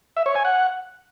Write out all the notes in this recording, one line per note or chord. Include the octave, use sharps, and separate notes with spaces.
E5
C#5
G#5
F#5